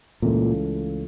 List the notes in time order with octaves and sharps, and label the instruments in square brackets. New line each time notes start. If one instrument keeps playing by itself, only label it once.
[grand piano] C#2 C#3 E3 A3 [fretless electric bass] A#2